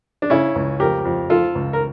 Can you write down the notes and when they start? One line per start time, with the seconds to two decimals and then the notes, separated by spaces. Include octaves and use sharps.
0.22 D4
0.30 C#3 C#4 E4
0.55 C#2
0.80 F2 G4 A#4
1.05 F2
1.30 F3 F4 A4
1.55 C#2
1.73 A#4